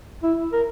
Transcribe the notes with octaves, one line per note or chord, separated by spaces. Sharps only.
E4
A#4